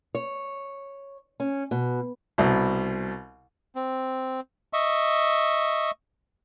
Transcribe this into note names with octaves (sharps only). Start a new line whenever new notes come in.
C#5
C#4
B2
C2 B2
C4
D#5 E5 C#6